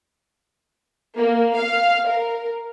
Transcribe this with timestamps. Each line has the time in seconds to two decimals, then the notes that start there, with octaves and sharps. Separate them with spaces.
1.17 A#3
1.57 F5
2.08 A#4